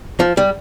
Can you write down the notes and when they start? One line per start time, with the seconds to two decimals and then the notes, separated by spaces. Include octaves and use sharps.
0.20 F3
0.37 G3